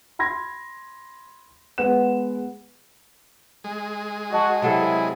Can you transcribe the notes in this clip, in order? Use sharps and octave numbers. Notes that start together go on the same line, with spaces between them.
B5 C6 G#6 A#6
G#3 B3 B4 F#5 F#6 E7
G#3
F#4 D#5 A5
C3 F#3 E4 A4